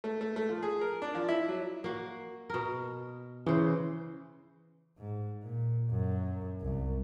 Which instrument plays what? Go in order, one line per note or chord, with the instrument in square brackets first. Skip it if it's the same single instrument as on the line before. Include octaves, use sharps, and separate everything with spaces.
[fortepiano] A3
A3
A3
F3
G#4
A#4
D4
F3
E4
F#3
[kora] A#3 F#4
B2 A#4
[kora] C#3 C5 [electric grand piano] E3
[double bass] G#2
A#2
F#2
C2